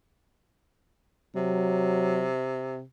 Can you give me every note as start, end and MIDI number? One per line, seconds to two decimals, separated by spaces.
1.36 2.83 48
1.36 2.29 54